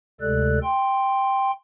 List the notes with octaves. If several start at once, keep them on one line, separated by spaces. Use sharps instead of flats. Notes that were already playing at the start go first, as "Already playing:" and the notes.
D2 C3 G#3 A4 D5 F#6
G5 C6